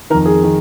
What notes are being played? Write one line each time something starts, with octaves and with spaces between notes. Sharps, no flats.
F2 D#3 A#4
G#4
D#3